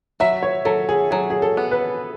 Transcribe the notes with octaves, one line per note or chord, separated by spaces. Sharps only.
F#3 E5
C#5
F#3 A4
G#4
F#3 G#4
G#4
A4
B3
B4